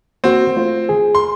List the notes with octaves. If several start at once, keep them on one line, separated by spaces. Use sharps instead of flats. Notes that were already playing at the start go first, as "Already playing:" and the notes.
A#3 C4 F#4
A3 F4 C5
G#4
C6